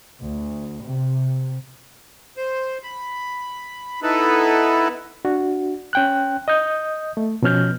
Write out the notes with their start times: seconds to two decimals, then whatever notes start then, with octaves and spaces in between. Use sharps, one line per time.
0.23 D2
0.84 C3
2.37 C5
2.83 B5
4.02 B3 D#4 E4 A4 B4
5.25 D4 F#4
5.93 C#4 G5 F#6
6.48 D#5 D#6 G6
7.17 A3
7.42 B2 F3 C#4 F6 G6